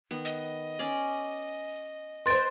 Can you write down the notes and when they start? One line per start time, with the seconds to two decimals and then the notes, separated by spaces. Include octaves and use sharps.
0.11 D#3 B3
0.25 D#5
0.79 C#4 G#4 D5
2.26 B4 C5 C6 A6 D7